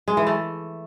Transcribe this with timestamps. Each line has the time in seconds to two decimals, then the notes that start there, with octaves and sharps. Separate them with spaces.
0.08 G#3
0.17 E3
0.27 A3